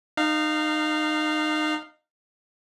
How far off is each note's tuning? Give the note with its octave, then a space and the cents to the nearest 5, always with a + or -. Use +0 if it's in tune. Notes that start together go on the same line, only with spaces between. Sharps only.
D#4 -25 F5 +0